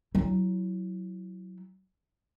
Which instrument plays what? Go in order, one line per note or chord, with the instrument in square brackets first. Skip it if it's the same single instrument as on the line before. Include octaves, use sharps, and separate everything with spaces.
[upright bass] F#3 E4